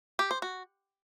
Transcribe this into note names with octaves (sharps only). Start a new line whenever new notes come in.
G4
C5
F#4